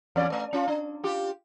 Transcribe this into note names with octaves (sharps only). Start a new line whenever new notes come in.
E2 C#4 D5
A3
C#4 F4
D4
F4 G4